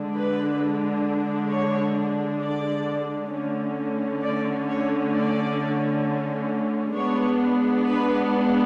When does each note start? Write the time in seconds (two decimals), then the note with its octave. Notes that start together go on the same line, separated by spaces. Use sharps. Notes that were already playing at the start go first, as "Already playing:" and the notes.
Already playing: D3 G#3 D4
0.16 B4
1.51 C#5
2.42 D5
3.33 D3 A3 C#4
4.23 D5
4.69 C#5
5.14 D5
6.95 G#3 B3 D4 C#5
7.86 B4